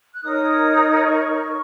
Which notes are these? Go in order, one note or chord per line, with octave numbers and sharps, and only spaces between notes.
F#6
D#4 A#4 C#5 D#6
C#6